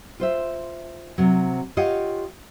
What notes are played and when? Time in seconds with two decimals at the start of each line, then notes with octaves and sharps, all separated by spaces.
0.20 F4 C5 E5
1.18 C3 F#3
1.77 F4 G4 C#5 D#5 F5 F#5